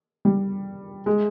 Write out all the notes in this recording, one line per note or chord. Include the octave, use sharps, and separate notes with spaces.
G3
G#3